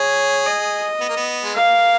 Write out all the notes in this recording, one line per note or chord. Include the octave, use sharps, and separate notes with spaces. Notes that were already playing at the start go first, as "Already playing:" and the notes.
Already playing: G#4 C#5
D#5
B3
A#3
B3
G#3
A#3 F5